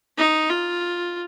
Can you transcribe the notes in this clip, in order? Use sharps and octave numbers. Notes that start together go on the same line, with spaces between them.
D#4
F4